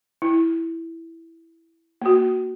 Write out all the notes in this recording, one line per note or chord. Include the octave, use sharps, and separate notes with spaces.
E4
A#3 F#4